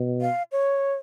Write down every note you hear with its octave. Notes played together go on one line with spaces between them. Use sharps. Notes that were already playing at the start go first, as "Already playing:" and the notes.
Already playing: B2
F5
C#5